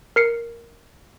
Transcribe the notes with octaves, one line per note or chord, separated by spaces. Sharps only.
A#4 C7 C#7